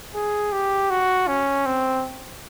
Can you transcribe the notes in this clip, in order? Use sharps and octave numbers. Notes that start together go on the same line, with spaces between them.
G#4
G4
F#4
C#4
C4